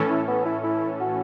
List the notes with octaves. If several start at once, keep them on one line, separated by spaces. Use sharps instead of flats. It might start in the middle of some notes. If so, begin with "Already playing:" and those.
Already playing: A2 E3 C#4 A4
E4
B3
E4
E4
F#4